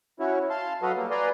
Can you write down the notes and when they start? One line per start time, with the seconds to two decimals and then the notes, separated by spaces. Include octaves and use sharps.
0.20 C#4 E4 F#4 C#5
0.50 F5 A5 C6
0.82 F#3 F#4 A4 B4 D#5 F5
0.96 G3 A#3
1.11 B4 D5 G#5 A#5 C6